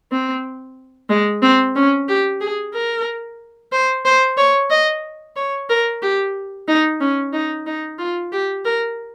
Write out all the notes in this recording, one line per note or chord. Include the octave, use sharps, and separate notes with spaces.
C4
G#3
C4
C#4
G4
G#4
A#4
C5
C5
C#5
D#5
C#5
A#4
G4
D#4
C#4
D#4
D#4
F4
G4
A#4